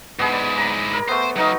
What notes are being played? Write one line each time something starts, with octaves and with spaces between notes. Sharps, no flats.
G#2 B3 E4 G#4
D5
A#5 B5
A#4
A3 B3 C5
F#3 B3 D#4 F5